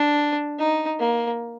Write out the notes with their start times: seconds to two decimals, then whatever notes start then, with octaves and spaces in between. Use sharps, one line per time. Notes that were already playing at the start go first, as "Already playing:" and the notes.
Already playing: D4
0.59 D#4
0.99 A#3